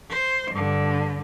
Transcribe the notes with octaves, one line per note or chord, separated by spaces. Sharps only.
C5
G2 D3